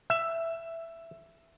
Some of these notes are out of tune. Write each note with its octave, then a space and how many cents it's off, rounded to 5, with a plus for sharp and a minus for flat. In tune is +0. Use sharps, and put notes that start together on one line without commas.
E5 +10